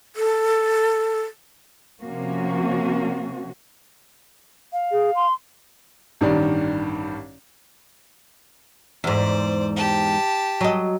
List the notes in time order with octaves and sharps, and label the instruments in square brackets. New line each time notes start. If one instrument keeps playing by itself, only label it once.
[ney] A4
[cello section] C3 F3 A#3 C#4 F#4
[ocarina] F5
[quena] G#4
C6
[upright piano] A1 G2 D#3 D4
[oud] E2 G#2 [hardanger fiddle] C5 D5
[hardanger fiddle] G4 A5
[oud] F#3 D#5